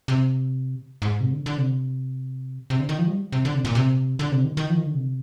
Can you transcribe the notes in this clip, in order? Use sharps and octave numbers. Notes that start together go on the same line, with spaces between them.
C3
G#2
C3
D3
D3
C3
C3
D3
D#3
F3
G3
C3
D3
C3
A#2
C3
D3
C3
D#3
D#3
F3
D#3
D3
C3